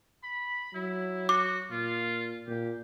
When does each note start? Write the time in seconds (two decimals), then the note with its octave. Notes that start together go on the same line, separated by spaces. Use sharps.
0.24 B5
0.74 F#3 E4
1.29 F#4 D6
1.71 A#2 F4
2.48 A#2 G4